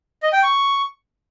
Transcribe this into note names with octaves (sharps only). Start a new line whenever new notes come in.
D#5
G5
C#6